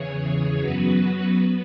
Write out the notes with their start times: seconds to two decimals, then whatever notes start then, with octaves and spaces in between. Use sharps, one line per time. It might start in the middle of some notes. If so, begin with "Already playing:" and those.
Already playing: E2 C#3 E3 G#4 C#5
0.24 G#4 C#5
0.61 F#2 F#3 B3 F#4 B4
1.34 B3